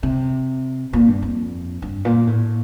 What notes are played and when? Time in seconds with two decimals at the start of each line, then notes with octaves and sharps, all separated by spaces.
0.03 C3
0.93 A#2
1.08 G2
1.22 F2
1.82 G2
2.05 A#2
2.27 A2